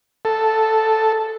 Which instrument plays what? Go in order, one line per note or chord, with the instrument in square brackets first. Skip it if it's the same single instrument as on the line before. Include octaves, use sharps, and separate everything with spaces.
[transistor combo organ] A4